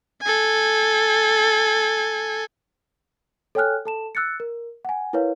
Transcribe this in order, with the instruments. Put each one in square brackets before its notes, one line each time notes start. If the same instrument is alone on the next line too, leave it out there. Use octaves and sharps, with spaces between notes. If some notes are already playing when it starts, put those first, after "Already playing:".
[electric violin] A4 G#5
[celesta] A4 C#5 G5 G#5 F6 F#6
A4 A5 E7
E6 F#6 A6 C#7
A#4
F#5 G#5
E4 A#4 B4 C#5 F5